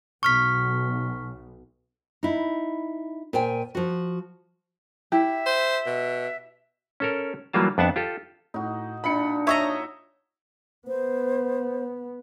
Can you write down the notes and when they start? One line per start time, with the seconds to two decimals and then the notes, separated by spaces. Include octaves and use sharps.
0.23 B1 C#6 F6 B6
2.23 D#4 E4
3.33 A#2 C5 G5 G#5
3.75 F3 F#4
5.12 E4 G4 E5
5.46 C5
5.86 B2
7.00 C#4 A4 A#4
7.53 E3 F#3 G3 A#3 F4 A5
7.78 F2 B3 D4 E5 F#5 A5
7.96 F4 G4 A4
8.54 A2 D#4 F#4
9.04 A#2 D4 D#4 B5 C#7
9.47 C#5 D#5 E5 A#5 C#6 E6
10.88 B3 C5